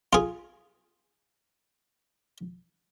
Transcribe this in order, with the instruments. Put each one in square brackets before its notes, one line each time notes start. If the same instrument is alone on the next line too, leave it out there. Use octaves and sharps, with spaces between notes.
[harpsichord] F4 G#4